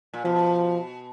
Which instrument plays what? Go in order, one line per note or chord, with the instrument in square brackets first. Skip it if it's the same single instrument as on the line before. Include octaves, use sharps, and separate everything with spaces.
[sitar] A#2
[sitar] B2 [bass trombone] F3